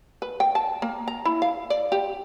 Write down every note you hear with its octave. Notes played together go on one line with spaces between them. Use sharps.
B4
G5
A5
A#3
A#5
E4
F5
D5
G4